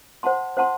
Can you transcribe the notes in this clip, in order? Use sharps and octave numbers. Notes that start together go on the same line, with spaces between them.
C5 F#5 A5 C6
C5 F#5 A5 C6